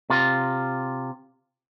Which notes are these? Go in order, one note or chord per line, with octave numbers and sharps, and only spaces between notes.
C3 F4